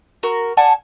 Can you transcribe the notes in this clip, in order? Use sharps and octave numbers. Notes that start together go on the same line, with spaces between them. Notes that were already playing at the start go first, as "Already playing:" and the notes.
F#4 A#4
D5 F#5 G#5 A5